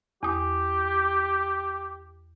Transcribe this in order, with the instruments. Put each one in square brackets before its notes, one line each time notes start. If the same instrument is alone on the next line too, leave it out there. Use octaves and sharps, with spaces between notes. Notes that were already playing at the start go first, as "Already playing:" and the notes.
[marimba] E2 D#6 [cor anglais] G4